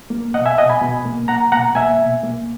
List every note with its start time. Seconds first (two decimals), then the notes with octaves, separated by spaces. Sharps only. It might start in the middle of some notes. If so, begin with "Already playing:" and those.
0.10 A#3
0.34 B2 D#5 F#5
0.46 E5 G#5
0.58 B2 D#5 F#5
0.70 G#5 B5
0.82 B2
1.05 A#3
1.28 A#3 F#5 A#5
1.52 B2 F#5 A#5
1.75 A#3 E5 G#5
1.99 B2
2.23 A#3